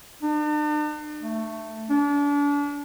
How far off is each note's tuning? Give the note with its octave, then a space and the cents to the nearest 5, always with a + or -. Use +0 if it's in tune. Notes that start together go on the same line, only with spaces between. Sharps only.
D4 +45
A3 +10
D4 -35